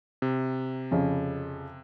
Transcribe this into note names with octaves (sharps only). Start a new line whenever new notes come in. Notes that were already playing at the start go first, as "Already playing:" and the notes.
C3
F2 C#3